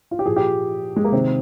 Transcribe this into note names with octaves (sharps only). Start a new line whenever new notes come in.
F4
G4
A#2 F3 G#4
G4
G#3
A#3
C3 D#3 C4